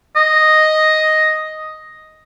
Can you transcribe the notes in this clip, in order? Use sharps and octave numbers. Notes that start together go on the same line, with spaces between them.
D#5